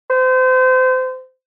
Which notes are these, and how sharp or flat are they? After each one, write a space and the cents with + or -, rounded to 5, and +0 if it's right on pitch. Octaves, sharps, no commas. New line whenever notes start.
C5 -30